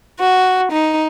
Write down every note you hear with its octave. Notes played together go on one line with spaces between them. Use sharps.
F#4
D#4